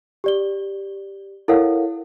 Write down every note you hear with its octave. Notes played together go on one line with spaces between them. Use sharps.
G4 D5 G7
E4 A4 A#4 C#5 F5 F#5